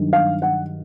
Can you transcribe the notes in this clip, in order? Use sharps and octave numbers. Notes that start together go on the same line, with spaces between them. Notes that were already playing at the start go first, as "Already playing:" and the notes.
Already playing: G2 D#3 F#3
F5
F#5